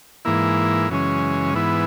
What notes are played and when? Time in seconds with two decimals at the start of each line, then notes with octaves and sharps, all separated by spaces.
0.25 G#2 E3 A#3 E4
0.89 F#2 C#3 E3 G#3 C#4
1.54 G#2 E3 B3 E4